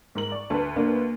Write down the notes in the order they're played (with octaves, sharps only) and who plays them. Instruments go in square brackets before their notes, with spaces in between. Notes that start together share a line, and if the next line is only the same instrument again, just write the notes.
[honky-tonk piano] G#2 A#4 F#7
D5 C#6
[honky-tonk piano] D2 B4 [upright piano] A5
[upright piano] A#3 D4